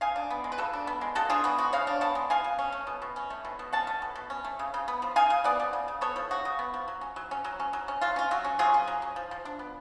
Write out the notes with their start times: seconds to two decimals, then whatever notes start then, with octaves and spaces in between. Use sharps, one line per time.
0.01 C#3 F5 G#5
0.16 D4
0.30 B3
0.44 G#3
0.52 B4
0.58 C#3 F#4 A4
0.73 D4
0.87 B3
1.01 G#3
1.15 C#3 F#4 A4
1.30 D4 F4 G#4
1.44 B3 F#4
1.58 G#3 F#4
1.73 C#3 C#5 F5
1.87 D4
2.01 B3 F#5 A5
2.15 G#3
2.30 B2 F5 G#5
2.44 B2
2.59 C#4
2.72 A3
2.87 B2
3.02 B2
3.16 C#4
3.30 A3
3.45 B2
3.59 B2
3.73 C#4 F#5 A5
3.87 A3
4.02 B2
4.15 B2
4.30 C#4
4.45 A3
4.59 C#3
4.74 C#3
4.88 B3
5.02 F3
5.16 C#3 F5 G#5
5.30 C#3
5.44 B3 D5 F#5
5.60 F3
5.73 C#3
5.88 C#3
6.01 B3 A4 C#5
6.16 F3
6.31 C#3 F#4
6.45 C#3
6.59 B3
6.74 F3
6.88 F#3
7.01 C#4
7.16 F#3
7.31 C#4
7.44 F#3
7.60 C#4
7.73 F#3
7.88 C#4
8.01 F#3 F4
8.16 C#4 F4
8.31 F#3 F#4
8.44 C#4
8.59 F#3 F4 G#4
8.74 C#4
8.88 F#3
9.02 C#4
9.16 F3
9.31 F3
9.45 D4
9.59 B3